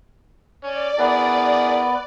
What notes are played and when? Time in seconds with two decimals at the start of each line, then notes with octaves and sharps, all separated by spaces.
0.64 C#4 D5
0.99 B3 E4 G#4 A#4 B4